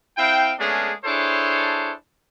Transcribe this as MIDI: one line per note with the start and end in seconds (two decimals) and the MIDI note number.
0.17 0.52 60
0.17 0.52 64
0.17 0.52 77
0.17 0.52 79
0.59 0.92 56
0.59 0.92 57
0.59 0.92 59
0.59 0.92 61
0.59 0.92 62
0.59 0.92 68
1.05 1.92 62
1.05 1.92 64
1.05 1.92 68
1.05 1.92 69
1.05 1.92 72
1.05 1.92 73